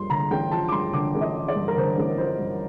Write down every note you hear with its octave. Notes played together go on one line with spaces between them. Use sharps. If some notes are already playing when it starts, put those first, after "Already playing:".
Already playing: G2 F3 C6
D3 A#5
A1 G5
F3 A5
D6
G2 C6
D3 D6
A1
D#5
F3
D5
G2
A#4
D3 C5
A1
F3 C5
G2